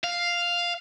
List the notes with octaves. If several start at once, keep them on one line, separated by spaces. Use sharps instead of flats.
F5